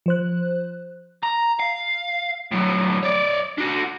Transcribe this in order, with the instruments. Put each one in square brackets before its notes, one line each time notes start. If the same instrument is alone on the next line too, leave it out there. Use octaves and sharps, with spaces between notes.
[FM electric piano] F3 C5 F#6
[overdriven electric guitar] A#5
F5
A2 F#3
C#5 D5
D4 F#4